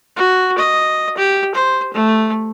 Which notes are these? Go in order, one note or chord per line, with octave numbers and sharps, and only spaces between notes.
F#4
D#5
G4
C5
A3